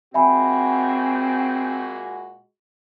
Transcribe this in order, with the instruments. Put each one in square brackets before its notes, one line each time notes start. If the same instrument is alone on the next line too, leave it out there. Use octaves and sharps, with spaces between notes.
[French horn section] A#2 G#3 F#4 [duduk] C4 [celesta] E5 G#5 B5